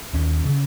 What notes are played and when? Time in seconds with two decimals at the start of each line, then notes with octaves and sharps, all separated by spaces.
0.13 D#2 C#4
0.45 C#3